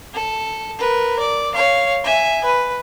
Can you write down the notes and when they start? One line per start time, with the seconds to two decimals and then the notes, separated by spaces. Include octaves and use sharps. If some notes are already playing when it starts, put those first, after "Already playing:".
0.14 A4
0.78 A#4 B4
1.19 D5
1.55 C#5 F5
2.04 E5 G#5
2.45 B4